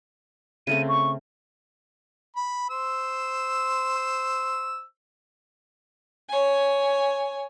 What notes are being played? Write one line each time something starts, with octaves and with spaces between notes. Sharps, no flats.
C#3 A3 C4 D#7
C#6
B5
C5 E6
C#5 G#5